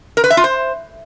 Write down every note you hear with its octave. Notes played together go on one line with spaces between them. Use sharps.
A#4
B4
E5
F4
C5